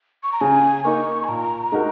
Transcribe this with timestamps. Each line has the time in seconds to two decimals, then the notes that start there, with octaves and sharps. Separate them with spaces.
0.23 C#6
0.32 A#5
0.41 C#3 G#5
0.84 A#3 D#4 A#4 C#6
1.24 G#5
1.28 A#2 A#5
1.72 G#3 D#4 F#4 A#4